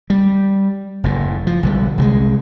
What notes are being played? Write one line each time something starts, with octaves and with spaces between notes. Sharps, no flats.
G3
F#1 A2
F3
B1 D3 G3
C2 F3 G#3